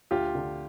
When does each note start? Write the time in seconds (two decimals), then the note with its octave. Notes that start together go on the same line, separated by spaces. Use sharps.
0.11 D2 F4 G4
0.35 D3